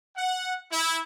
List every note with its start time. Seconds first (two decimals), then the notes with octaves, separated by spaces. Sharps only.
0.16 F#5
0.72 E4